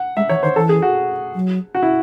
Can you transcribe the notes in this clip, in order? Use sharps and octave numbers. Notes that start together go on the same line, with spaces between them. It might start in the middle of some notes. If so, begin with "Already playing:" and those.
Already playing: F#5
G#3 E5
E3 C#5
D#3 C5
E3 A4
G#4
F#4
F#3
F#4
E4